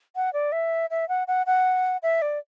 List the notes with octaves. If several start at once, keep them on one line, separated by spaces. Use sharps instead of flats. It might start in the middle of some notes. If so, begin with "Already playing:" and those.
F#5
D5
E5
E5
F#5
F#5
F#5
E5
D5